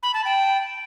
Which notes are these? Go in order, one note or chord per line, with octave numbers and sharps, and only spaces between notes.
B5
A5
G5